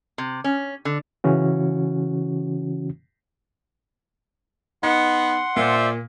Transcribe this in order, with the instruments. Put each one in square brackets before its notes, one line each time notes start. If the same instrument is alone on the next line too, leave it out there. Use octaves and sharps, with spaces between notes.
[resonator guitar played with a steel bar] C3
C#4
D3
[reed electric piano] C#3 E3 C#4 F#4
[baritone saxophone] B3 [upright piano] D#4 [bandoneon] F#5 C6
[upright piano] A#2 [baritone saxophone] F4 [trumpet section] C5 D5 E5